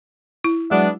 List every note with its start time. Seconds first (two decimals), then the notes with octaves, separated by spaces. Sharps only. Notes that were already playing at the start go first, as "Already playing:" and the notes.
0.44 E4
0.70 F#3 G#3 B3 D4 E5